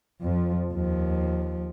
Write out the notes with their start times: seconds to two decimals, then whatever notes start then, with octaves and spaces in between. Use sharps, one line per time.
0.22 F2 F3
0.73 D#2 F3